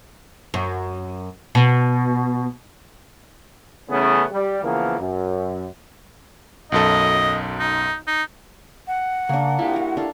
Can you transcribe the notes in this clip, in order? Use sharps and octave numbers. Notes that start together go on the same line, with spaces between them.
F#2
B2
C#3 E3 A3 B3 C#4
G3
C#3 E3 F3 A#3 B3 A#4
F#2
B1 F#2 A4 D#5
D#4
D#4
F#5
C#3 A#3 D4
E4 F4 G4
F#4 A#4
D4 A4 F5